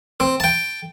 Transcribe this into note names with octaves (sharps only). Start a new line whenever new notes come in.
C4
G5 A5